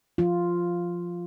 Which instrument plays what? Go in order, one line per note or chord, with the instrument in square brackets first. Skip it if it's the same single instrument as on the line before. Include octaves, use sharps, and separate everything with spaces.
[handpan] F3 F4